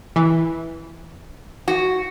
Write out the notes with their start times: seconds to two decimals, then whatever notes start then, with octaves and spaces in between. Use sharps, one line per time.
0.16 E3
1.68 F#4